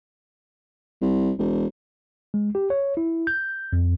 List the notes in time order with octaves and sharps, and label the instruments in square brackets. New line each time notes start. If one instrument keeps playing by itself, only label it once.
[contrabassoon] C2
E1
[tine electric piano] G#3
G4
C#5
E4
G6
F2